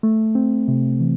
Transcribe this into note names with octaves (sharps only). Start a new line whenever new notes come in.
A3
C4
C3
E3